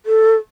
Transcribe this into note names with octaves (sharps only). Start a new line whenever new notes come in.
A4